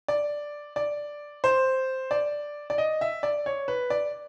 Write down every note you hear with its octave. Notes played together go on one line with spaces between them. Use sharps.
D5
D5
C5
D5
D5
D#5
E5
D5
C#5
B4
D5